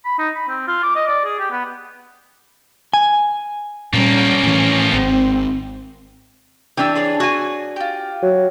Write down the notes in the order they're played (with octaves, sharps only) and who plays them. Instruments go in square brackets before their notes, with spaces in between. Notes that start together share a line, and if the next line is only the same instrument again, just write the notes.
[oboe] B5
D#4
B5
C4
F4
D6
D#5
D5
G#4
G4
B3
[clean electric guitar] G#5
[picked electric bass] A#2 G3 [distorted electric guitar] F3 A#3 [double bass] C#4
[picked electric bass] A2 E3
[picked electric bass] G#1 [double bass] C4
[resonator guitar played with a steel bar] E3 D4 [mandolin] G4 E6
[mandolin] G#4 C#5 D5
[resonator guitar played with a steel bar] F#4 G#5
[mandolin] F4 G4
[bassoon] F#3